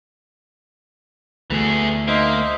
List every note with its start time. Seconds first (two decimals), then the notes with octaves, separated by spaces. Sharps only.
1.50 D2 E3 A3 G#4
2.08 A#3 D#4 C5 E5